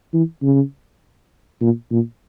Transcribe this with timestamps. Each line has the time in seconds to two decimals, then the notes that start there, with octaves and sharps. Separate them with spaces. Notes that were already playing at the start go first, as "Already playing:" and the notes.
0.13 E3
0.43 C#3
1.61 A#2
1.91 A#2